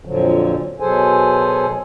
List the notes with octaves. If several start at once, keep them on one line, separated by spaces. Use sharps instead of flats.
F2 A#2 D3 F3 F#3
B2 F#3 G#4 A4 C5 G#5